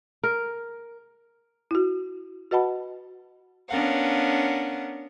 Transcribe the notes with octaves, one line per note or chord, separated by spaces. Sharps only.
A#4
E4 F#4
F#4 B4 D#5 F#5 A5 B5
B3 C#4 D4 A#4 F5 F#5